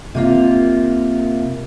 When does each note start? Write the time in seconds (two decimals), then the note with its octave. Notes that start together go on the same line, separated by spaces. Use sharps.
0.15 C3 A#3 F4